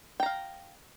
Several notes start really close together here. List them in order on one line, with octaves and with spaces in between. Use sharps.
G5 A#5 F5